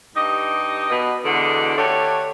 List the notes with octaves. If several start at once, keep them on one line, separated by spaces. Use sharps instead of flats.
G2 D#4 G4 D#5
B2
E2 B2 D3
D3 A3 G4 C#5